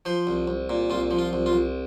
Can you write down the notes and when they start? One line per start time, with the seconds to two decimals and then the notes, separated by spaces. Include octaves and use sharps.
0.05 F3 C5
0.27 C2
0.48 C2
0.70 A#2
0.90 C2 F4
1.11 F3
1.19 F4
1.33 C2
1.46 F4
1.53 C2